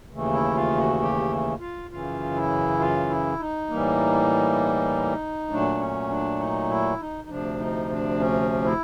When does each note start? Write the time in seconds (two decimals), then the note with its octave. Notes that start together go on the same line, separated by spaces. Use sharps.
0.11 D#2 C#3 E3 A3
0.33 E4
0.55 F4
0.78 F#4
1.01 G4
1.60 F4
1.90 F#2 C#3 E3 F4
2.35 E4
2.80 F4
3.10 E4
3.40 D#4
3.70 A2 E3 G3 A#3
5.50 A#2 F#3 A3 D4
5.80 C#4
6.10 D4
6.39 D#4
6.69 E4
7.00 D#4
7.25 D#4
7.29 D2 C3 F3 D4
7.59 D#4
7.90 D4
8.19 C#4
8.64 E4